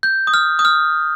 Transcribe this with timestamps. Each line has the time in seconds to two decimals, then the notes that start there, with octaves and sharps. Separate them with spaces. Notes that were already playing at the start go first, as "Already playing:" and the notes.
0.03 G6
0.27 D#6
0.34 F6
0.59 D#6
0.65 F6